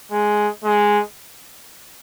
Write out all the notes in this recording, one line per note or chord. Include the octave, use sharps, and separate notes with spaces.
G#3
G#3